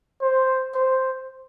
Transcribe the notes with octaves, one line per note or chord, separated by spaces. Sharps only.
C5
C5